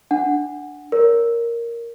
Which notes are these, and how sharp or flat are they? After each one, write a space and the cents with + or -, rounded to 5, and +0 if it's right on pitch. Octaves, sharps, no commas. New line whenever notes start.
D4 +0 F#5 +0
A#4 +0 C#5 +35